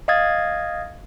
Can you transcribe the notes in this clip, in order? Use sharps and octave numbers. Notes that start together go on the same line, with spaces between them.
D#5 F5 D#6 G#6 A6